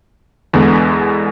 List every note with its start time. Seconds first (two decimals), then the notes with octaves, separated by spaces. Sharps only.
0.53 E2 D3 G#3 B3